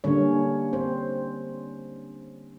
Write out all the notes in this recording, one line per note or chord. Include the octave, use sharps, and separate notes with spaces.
D3 G3 A#3 C#4 D4 C#5
C4 C5